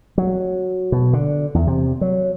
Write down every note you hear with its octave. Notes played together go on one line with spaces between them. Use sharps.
F#3
B2
D3
E2
C3
F#3